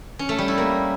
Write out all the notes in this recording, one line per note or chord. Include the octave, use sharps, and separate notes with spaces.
C#4
A3
G3
E4
A#3